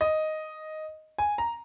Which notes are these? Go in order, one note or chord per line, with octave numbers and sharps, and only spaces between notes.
D#5
G#5
A#5